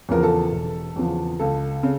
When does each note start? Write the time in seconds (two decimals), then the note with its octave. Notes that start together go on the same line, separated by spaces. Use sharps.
0.09 E2 C#3 F3 A#4
0.23 A4
0.52 E1
0.96 E2 C#3 F3
1.39 C#2 A4
1.83 C#3